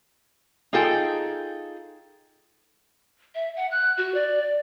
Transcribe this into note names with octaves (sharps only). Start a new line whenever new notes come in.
D#4 F4 G#4 A4 G5
E5
F#5
F#6
F#4
D5